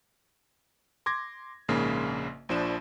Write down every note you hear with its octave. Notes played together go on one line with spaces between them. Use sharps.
C6 D6 G#6 A#6
A#1 G#2 C#3 A#3
A#1 F3 D4 E7